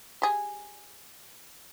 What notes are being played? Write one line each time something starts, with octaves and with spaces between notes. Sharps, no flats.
G4 G#4